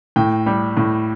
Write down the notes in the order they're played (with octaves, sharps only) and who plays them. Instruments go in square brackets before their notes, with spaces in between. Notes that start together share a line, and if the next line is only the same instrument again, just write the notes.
[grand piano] A2 G5
G3
A2